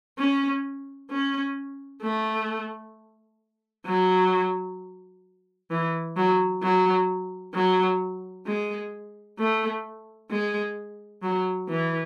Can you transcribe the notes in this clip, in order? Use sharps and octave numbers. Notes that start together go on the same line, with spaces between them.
C#4
C#4
A3
F#3
E3
F#3
F#3
F#3
G#3
A3
G#3
F#3
E3